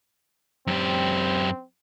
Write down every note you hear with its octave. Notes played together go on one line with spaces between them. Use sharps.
F#2 C4 G4